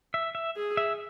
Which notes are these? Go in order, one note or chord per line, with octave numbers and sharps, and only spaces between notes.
E5
E5
G#4
E5